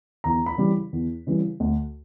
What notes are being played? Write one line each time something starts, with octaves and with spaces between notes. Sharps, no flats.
E2 A#5
B5
C#3 E3 G3
E2
C#3 E3 G3
D2